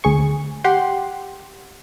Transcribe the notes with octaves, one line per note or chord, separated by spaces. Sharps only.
D2 G#4 C#6
G4 F#5 C6